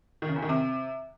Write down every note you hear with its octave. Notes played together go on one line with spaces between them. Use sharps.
D#3
C#3
E2
D#3
C3